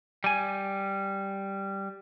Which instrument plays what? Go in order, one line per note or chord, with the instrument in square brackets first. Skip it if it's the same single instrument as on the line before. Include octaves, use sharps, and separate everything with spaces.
[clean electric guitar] G3 G#5